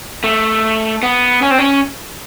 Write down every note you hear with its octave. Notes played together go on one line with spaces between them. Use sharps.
A3
B3
C#4
C4
C#4